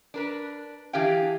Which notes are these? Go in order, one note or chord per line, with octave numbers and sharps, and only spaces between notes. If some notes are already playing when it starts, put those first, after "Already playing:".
D4 A#4 B4
E3 D4 G4 G#4 F5 G5